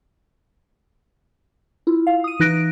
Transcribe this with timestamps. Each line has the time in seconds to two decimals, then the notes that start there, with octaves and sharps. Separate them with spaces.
1.87 E4 F4
2.07 F5
2.24 D#6 D#7
2.40 E3 D#4 F#6 A#6 D7